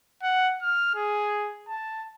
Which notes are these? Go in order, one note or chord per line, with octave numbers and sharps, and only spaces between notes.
F#5
F6
G#4
A5